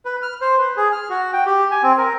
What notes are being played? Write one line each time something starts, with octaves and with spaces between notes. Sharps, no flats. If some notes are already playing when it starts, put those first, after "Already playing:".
B4
F6
C5
B4
G#4
F6
F#4
G5
G4
G#5
C4
A#4